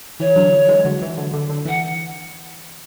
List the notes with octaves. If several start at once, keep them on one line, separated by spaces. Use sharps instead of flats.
E3 C#5
D3 F#3
E3 G#3
D3 F#3
E3
D3
D3
D3
E3 F#5